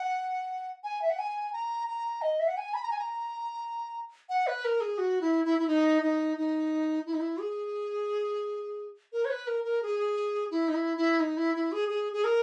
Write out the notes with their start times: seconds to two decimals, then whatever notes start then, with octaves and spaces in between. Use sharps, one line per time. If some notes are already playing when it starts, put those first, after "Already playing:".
Already playing: F#5
0.84 G#5
1.02 E5
1.10 F#5
1.19 G#5
1.53 A#5
1.88 A#5
2.22 D#5
2.40 E5
2.48 F#5
2.57 G#5
2.74 B5
2.83 A#5
2.91 G#5
2.99 A#5
4.29 F#5
4.47 B4
4.65 A#4
4.81 G#4
4.98 F#4
5.21 E4
5.45 E4
5.59 E4
5.67 D#4
6.02 D#4
6.37 D#4
7.06 E4
7.13 D#4
7.20 E4
7.40 G#4
9.13 A#4
9.25 C#5
9.30 B4
9.47 A#4
9.64 A#4
9.83 G#4
10.51 E4
10.68 D#4
10.74 E4
10.97 E4
11.20 D#4
11.37 E4
11.55 E4
11.72 G#4
11.89 G#4
12.13 G#4
12.24 A#4